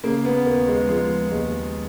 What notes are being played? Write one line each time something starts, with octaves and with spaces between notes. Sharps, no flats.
C#3 A#3
B3
D#2 A#3
G#3
F3 G#3
D#2 G#3